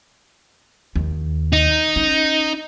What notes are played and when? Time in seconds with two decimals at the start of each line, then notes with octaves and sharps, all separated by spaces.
0.96 D#2
1.53 D#4
1.96 C#4